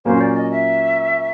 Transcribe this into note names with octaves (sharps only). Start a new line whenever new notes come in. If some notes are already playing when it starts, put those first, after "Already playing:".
A#2 F#3 A#3 C#4 C5
D5
D#5
E5